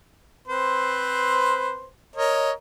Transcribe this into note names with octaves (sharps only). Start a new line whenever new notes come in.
C4 B4 C5
A#4 C#5 D#5